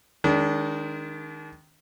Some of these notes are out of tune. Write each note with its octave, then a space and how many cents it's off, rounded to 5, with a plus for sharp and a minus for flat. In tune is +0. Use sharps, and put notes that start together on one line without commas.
D#3 +0 G#3 +0 D4 -35